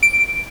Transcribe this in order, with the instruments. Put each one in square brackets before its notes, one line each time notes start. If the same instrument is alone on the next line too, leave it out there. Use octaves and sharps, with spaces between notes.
[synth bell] D7